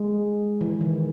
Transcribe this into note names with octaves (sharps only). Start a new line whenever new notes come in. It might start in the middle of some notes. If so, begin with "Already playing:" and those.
Already playing: G#3
E3
D#3